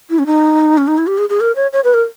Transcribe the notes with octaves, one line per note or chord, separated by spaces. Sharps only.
E4
C#4
D#4
C#4
D#4
E4
G4
G#4
G#4
A#4
C#5
C#5
B4
A#4